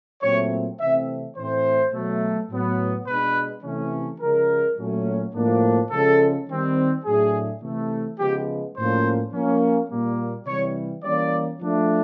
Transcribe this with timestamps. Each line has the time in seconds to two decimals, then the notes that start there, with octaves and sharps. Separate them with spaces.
0.22 A#2 F#3 A3 C4 C#5
0.79 C3 E3 A3 C4 E5
1.36 A2 E3 A3 C4 C5
1.93 B2 F#3 A3
2.50 A2 F#3 B3
3.07 B2 G#3 B3 D4 B4
3.64 C3 E3 A3 C#4
4.20 C#3 F3 G#3 C#4 A#4
4.78 A#2 F#3 A3 C#4
5.34 A2 F3 A#3 D4
5.91 C#3 F3 G#3 C#4 A4
6.48 D#3 G3 C4
7.05 A2 F#3 A3 D4 G#4
7.62 C3 E3 A3
8.19 C#3 F3 G#3 B3 G4
8.76 A2 F3 A#3 C#4 C5
9.32 F3 A#3 C#4
9.90 A#2 G3 A#3
10.46 C3 E3 G3 C#5
11.03 E3 G3 A#3 C#4 D5
11.60 F3 A3 D4